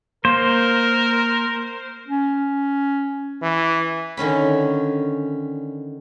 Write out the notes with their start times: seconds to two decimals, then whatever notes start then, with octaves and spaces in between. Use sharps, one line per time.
0.25 A#3 A#4 C5
2.08 C#4
3.42 E3
4.17 D3 D#3 C#4 B5